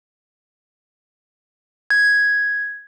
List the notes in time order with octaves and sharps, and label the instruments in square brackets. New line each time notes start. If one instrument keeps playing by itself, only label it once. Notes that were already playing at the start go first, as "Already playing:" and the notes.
[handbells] G#6